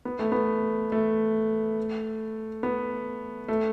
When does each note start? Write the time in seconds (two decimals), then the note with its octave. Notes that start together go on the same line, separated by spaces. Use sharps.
0.05 B3
0.19 A3
0.32 B3
0.92 A3
2.63 B3
3.48 A3